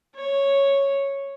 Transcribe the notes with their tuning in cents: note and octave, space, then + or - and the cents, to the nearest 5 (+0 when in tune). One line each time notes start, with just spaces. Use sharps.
C#5 -5